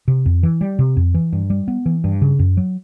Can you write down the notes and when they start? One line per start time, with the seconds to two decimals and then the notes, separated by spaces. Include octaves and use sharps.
0.08 C3
0.26 F2
0.43 E3
0.61 G3
0.79 C3
0.97 F2
1.14 E3
1.33 G2
1.50 G3
1.68 B3
1.86 E3
2.04 G2
2.22 C#3
2.39 F#2
2.57 F#3